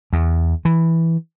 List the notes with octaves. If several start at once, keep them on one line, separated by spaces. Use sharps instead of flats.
E2
E3